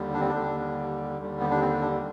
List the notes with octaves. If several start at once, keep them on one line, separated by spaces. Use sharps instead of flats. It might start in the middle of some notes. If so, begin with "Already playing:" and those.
Already playing: D#2 D3 G3
D4
C4
D4
D#2 D3 G3
D#2 D3 G3
B3
D4
C4
D4